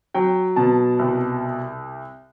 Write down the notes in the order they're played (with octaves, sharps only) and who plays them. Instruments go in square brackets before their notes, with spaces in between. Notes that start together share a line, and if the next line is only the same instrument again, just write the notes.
[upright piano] F#3 G5
B2 A5
C2